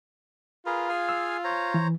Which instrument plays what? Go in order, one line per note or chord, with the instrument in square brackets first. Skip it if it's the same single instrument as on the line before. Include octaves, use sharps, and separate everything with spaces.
[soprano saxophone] F4 [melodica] G#4 A#4 B4
[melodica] G#4 F5 G#5
[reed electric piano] E6
[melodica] C5 C#5 A#5
[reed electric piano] E3